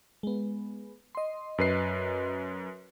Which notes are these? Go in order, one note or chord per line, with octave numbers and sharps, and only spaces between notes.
G#3 B3
D#5 C6
F#2 B4 C7